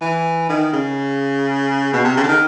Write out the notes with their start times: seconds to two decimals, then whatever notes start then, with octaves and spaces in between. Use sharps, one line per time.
0.01 E3
0.49 D#3
0.73 C#3
1.93 B2
2.05 C3
2.17 C#3
2.23 D3
2.29 D#3